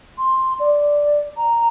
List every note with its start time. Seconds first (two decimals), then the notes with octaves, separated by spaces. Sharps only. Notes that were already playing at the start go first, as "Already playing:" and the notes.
0.18 C6
0.60 D5
1.37 A#5